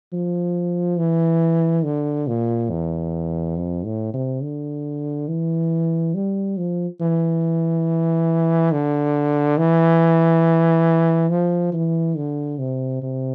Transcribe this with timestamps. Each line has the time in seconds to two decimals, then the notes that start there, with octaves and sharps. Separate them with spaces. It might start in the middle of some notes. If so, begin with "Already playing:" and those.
0.12 F3
0.98 E3
1.84 D3
2.28 A#2
2.70 E2
3.56 F2
3.85 A2
4.14 C3
4.42 D3
5.28 E3
6.15 G3
6.57 F3
7.00 E3
8.72 D3
9.58 E3
11.30 F3
11.73 E3
12.17 D3
12.59 C3
13.02 C3